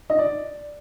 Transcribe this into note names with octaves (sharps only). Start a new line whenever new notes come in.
D#5
D5